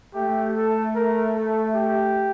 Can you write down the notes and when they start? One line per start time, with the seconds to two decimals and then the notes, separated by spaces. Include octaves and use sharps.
0.15 A3 G4
0.55 A4
0.95 A#4
1.35 A4
1.75 G4